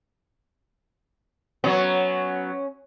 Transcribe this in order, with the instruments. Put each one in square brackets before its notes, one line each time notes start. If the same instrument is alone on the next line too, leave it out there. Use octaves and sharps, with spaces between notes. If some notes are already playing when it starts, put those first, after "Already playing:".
[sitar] F#3 B3 [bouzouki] C#4